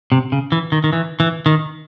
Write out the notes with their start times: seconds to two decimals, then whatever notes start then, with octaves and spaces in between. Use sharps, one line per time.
0.12 C3
0.32 C#3
0.52 E3
0.72 D#3
0.84 D#3
0.93 E3
1.20 E3
1.46 D#3